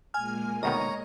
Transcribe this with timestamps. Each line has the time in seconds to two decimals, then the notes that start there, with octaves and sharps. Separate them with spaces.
0.14 A#2 G#3 A#3 G#5 F6
0.63 D2 B2 D#3 C#5 D#5 A#5